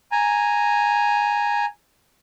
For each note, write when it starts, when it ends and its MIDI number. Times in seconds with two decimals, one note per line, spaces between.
0.12 1.65 80
0.12 1.65 82